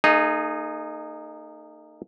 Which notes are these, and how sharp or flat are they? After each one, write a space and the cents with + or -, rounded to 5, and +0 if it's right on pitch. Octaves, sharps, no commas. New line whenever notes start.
A#3 -45 D#4 -20 G#4 +0